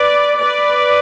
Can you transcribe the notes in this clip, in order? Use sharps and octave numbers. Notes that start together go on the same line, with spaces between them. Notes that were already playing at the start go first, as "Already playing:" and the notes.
Already playing: B4 D5
B4 D5